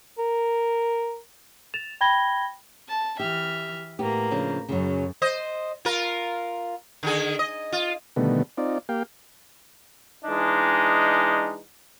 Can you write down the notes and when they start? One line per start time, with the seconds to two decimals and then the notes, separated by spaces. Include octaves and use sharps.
0.19 A#4
1.74 A6 E7 F7
2.01 G5 B5 G#6 A#6 G7
2.88 A5
3.19 E3 G4 E5 F6
3.99 A2 A#3 B3 G4 A#5
4.31 C#3 F3 D4
4.69 F#2 C#3 F#3
5.22 C5 D#5
5.85 F4 A#4
7.03 D3 D#3 G#4
7.39 D#5
7.72 F4
8.16 B2 D3 D#3 G3 A3 B3
8.57 C4 D#4 F4 D5
8.89 A#3 G4 F5 G5
10.25 E3 G#3 D4 D#4